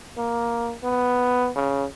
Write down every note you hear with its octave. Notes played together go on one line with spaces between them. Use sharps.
A#3
B3
C#3